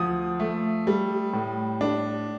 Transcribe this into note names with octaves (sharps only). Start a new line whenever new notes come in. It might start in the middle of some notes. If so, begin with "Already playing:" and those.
Already playing: D2 F3 D#6
A3
G3
A2
D4